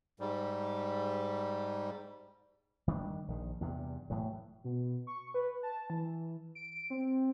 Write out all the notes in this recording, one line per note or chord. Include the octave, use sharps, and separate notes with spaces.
G#2 G3
D#3 G3 C#4 D4
A#1 D#3
E2 G2 C3
A2 E3 F#3
B2
C#6
B4
A5
E3
D7
C4